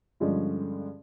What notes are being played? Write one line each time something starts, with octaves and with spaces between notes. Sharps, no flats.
G2 D3 F3 G#3 C#4